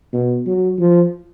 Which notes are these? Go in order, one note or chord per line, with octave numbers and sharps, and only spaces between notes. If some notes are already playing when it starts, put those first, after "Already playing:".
B2
F#3
F3